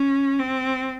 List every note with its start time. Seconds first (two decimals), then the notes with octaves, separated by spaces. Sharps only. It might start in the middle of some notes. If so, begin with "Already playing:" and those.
Already playing: C#4
0.39 C4